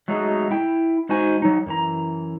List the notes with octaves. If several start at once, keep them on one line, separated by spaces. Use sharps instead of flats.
F#3 G#3 A3 D#4 F#4 G#4
E4 G5
G#3 D#4 F#4 C5 G#5
F#3 D#4
F#2 E3 A#5